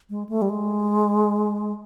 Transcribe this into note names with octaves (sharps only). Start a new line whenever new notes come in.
G#3
A3
G3
G#3